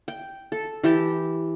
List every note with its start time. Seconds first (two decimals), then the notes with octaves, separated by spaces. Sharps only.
0.08 G5
0.52 A4
0.84 E3 G4 A5